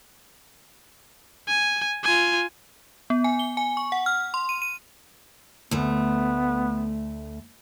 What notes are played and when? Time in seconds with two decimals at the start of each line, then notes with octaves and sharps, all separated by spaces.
1.48 G#5
2.04 F4 G#5
3.10 B3
3.24 G#5
3.39 G7
3.57 G#5
3.77 C#6
3.92 F#5
4.06 F6
4.34 C6
4.49 D#7
4.62 D#7
5.71 D2 A3 B3